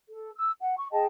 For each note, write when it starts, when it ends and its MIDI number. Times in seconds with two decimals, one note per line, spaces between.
0.10 0.30 69
0.35 0.51 88
0.60 0.75 78
0.76 0.86 85
0.92 1.05 68
0.92 1.05 75
0.92 1.05 79
0.92 1.05 81